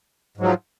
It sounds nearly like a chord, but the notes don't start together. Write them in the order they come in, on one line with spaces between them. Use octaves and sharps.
G#2 F#3 F3